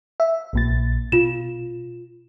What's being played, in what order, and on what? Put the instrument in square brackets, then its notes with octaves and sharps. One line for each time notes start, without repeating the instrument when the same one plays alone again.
[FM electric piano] E5
A#1 A#2 A6
[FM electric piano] B2 [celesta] F4 E7